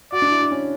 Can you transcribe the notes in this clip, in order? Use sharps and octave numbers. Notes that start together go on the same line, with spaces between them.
F#4 D5
D4
E4
D4
C#4